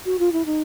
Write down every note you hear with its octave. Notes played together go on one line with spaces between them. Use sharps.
F#4
F4
E4
D#4